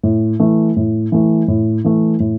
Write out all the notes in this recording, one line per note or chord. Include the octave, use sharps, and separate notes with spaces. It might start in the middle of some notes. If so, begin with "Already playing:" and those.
A2
E3 A3
A2
E3 A3
A2
E3 A3
A2